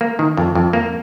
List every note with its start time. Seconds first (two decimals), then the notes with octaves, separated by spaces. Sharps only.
0.01 A#3
0.19 D#3
0.37 F2
0.55 F2
0.73 A#3